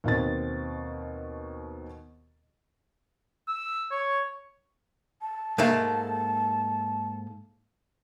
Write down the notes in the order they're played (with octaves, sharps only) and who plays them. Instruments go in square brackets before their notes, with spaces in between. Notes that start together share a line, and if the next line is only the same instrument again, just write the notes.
[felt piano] D#2 B2 C4 A6
[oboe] E6
C#5
[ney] A5
[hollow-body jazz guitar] G#2 A3 A#3